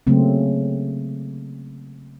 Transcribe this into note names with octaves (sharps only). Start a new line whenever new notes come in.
C#3 F#3 A3 A#3 C4